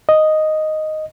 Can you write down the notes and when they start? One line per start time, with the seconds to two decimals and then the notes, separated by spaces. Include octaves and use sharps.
0.09 D#5